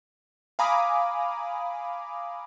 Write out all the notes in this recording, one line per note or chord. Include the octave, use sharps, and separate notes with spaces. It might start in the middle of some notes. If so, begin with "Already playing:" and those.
F5 G#5 A#5 B5 D6 D#6